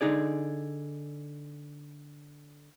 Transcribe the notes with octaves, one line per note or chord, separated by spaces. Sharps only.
D3 D#4 G#4 D5